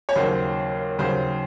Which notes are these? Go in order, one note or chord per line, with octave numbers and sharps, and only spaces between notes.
C#5
D#2 C#3 F#3 C5
D#2 C#3 F#3 C5